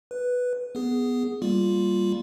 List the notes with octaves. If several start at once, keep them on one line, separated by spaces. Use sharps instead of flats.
B4
B3 G#4
G3 A#3 F4